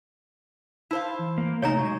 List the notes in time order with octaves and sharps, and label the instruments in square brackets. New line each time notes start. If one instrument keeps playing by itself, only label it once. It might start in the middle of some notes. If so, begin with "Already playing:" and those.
[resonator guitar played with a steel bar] E4 C5 F5 [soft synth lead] A5
[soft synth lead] E3
[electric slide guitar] A#3
[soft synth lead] C3 [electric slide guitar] A3 D#4 [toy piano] C#5 G#5 A#5
[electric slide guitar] F#3 G#3 [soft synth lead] C#6